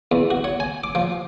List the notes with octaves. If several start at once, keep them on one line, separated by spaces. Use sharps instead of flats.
E2
F#4
C#5
G#5
D6
F3